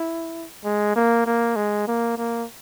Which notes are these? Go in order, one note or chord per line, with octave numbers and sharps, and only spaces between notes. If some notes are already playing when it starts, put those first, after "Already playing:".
Already playing: E4
G#3
A#3
A#3
G#3
A#3
A#3